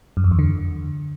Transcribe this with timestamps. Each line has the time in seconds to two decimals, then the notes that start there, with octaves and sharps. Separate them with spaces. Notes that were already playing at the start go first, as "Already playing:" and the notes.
0.17 F#2
0.24 F2
0.31 E2
0.39 D3